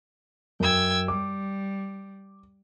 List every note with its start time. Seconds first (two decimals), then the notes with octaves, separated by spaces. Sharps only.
0.60 F#2 G5 E6 G#6
1.08 G3 D6